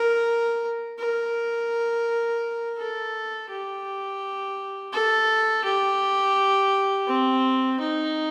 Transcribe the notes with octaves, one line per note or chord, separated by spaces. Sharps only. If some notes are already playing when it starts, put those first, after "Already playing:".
Already playing: A#4
A#4
A4
G4
A4
G4
C4
D#4